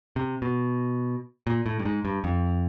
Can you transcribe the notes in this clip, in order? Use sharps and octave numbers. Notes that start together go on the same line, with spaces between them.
C3
B2
A#2
A2
G2
G#2
G2
F2